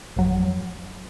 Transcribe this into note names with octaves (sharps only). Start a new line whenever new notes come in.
G#1 F2 F#3